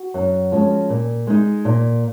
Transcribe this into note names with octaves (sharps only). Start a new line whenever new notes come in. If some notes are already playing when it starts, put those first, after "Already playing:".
Already playing: F#4
F#2
F3 G#3 C#4 F4
A#2
G#3 D#4
A#2